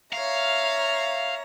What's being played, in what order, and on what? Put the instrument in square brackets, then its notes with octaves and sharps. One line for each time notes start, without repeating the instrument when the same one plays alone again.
[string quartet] C#5 E5 A#5 [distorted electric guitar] F5